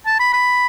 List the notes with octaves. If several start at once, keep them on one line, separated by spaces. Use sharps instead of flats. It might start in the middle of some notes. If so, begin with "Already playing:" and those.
A5
B5
B5